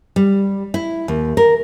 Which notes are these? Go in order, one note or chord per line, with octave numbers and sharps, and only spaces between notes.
G3
E4
D#2
A#4